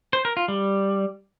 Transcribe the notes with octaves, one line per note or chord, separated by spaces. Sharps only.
C5
A#4
F4
G3